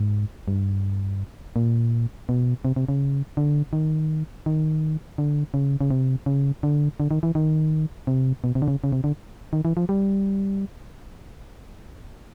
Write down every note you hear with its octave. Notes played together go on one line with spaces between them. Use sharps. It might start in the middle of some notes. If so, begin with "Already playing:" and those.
Already playing: G#2
G2
A#2
B2
C3
C3
C#3
D3
D#3
D#3
D3
C#3
C#3
C3
C#3
D3
D3
D#3
E3
D#3
C3
B2
C3
D3
C#3
C#3
C3
D3
D#3
E3
F3
G3